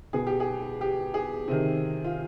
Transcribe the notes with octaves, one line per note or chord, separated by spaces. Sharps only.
B2 G#4
G4
G#4
G4
G#4
C3 D#3
F4